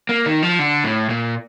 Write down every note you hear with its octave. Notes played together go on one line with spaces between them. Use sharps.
A#3
D#3
F3
D3
A2
A#2